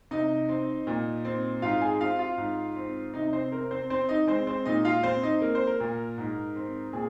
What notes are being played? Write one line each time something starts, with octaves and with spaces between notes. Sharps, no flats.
C3 D#4 D#5
C4
A#2
C4
G#2 F4 F5
G#4 G#5
C4 F4 F5
F4 F5
G#2
C4
C3 D#4 D#5
C4 C5
C4 A#4
C4 C5
C4 C5
D#4 D#5
G#3 C4 C5
C4 C5
A#2 D#4 D#5
F4 F5
C4 C5
D#4 D#5
A#3 A#4
C5
A#4
A#2
G#2
C4
A#2 G#4